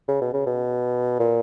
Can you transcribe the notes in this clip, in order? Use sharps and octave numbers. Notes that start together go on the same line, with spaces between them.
C#3
B2
C#3
B2
A#2